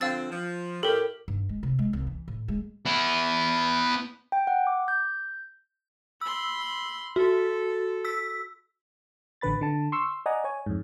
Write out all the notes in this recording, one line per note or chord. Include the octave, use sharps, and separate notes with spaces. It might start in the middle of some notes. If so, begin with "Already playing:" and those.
D3 F3 C4 F5 E6 A6
F3
A2 G4 A4 A#4
G2
G#3
C3
G#3
C2
E3
A2
G#3
B3 E4
G5
F#5
D6
G6
B5 C6 E6
F#4 A4
E6 B6
A1 D3 B4 B5 A6
D3 A5
C6 C#6 E6
D5 D#5 F#5 G#5 A#5
C#5 G#5
F2 G#2